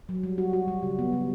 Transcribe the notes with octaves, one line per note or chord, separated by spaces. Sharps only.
F#3
G3
F#4
F#4
G3
C#3
B3
G3